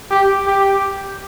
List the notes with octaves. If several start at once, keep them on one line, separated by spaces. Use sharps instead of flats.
G4
G4